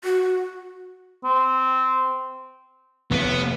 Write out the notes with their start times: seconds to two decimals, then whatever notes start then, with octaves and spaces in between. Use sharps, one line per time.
0.04 F#4
1.24 C4
3.11 F1 A2 C3 B3